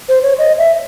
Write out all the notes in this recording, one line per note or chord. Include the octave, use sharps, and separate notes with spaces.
C5
C#5
D#5
E5